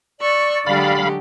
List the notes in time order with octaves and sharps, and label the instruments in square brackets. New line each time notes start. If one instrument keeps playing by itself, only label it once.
[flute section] D5 [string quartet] C#6 E6 F#6
[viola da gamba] D3 G4 [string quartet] F#3 G#3 [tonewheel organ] F5 B5